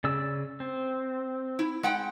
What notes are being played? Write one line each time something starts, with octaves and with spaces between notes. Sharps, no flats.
C#3 D5 E6
C4
E4
G#3 F#5 G5